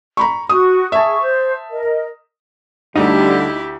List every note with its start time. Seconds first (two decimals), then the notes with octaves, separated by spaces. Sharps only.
0.17 A#5 B5 C#6
0.49 F#4 C#6 D#6
0.92 G#4 E5 A5 C#6
1.21 C5
1.70 A#4 D#5
2.96 D2 D3 G3 D#4 E4 G4